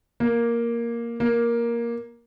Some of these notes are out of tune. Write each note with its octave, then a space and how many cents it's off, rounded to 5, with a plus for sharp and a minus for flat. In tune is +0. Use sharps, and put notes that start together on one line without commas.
A#3 +5
A#3 +10